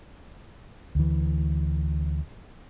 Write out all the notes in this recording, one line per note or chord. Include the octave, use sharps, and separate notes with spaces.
D2 E3